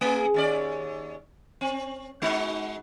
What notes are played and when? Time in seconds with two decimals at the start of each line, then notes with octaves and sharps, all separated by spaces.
0.01 A3 G#4
0.34 D#2 C#4 D5
1.61 C4
2.22 G#3 D#4 F#4